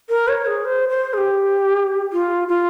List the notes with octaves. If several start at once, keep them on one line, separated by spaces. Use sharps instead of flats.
A#4
C#5
G#4
C5
C5
G#4
G4
F4
F4